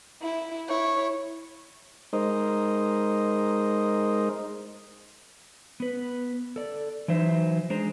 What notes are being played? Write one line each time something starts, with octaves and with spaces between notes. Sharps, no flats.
E4
E4 C#5
G#3 D#4 A#4 C5 D#5
B3 B4
A4 D5
E3 F#3 D#4 C5 E5
G#3 D4 G#4 C5 A#5